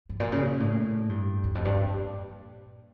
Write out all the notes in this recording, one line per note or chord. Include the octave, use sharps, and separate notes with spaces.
G2
A#2
C#3
A#2
A2
G2
E2
F2
G2
A#2